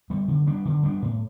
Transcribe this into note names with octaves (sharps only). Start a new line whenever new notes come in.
G3 B3
D3
G3 B3 D4
D3
G3 B3 D4
A2